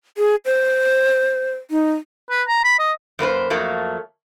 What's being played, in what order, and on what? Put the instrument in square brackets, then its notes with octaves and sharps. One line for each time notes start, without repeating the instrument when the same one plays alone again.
[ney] G#4
C5
D#4
[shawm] B4
A#5
B5
D#5
[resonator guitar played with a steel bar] F#2 A#3 B4 C5
F2 F#3 A3 A#3